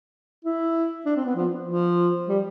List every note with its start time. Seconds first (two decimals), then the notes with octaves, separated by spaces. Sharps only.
0.45 E4
1.06 D4
1.16 C4
1.25 B3
1.36 F3
1.67 F3
2.28 G3